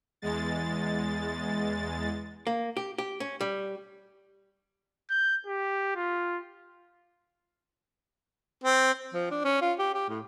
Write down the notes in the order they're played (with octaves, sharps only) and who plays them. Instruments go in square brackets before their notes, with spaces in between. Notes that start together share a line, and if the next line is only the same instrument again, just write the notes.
[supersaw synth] E2 G#3 A6
[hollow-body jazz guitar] A#3
G4
G4
C#4
G3
[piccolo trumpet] G6
G4
F4
[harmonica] C4
[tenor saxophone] F3
D4
C#4
F4
G4
G4
A2